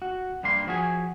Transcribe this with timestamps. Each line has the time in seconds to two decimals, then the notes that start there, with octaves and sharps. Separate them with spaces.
0.02 F#4
0.43 G2 G3 A#3 C6
0.67 F3 F#4 G#4 G#5